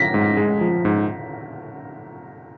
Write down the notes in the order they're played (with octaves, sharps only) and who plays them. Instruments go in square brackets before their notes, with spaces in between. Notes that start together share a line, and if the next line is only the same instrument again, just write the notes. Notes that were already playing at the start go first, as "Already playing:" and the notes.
Already playing: [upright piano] A#6 B6
[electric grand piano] G#2
G#3
F3
G#2